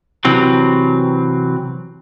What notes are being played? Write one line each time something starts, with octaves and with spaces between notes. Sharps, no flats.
C3 E3 F#3 C4